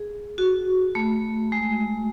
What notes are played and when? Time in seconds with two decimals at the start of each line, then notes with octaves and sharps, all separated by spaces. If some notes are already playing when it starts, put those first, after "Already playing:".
Already playing: G#4
0.38 F#4
0.95 A3
1.52 G#3